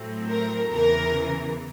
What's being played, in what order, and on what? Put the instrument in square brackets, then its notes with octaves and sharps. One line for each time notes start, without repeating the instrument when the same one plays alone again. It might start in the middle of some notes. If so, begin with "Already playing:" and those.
Already playing: [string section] A2 F#3 A3 C4
A#4
E2 C#3 E3 A#4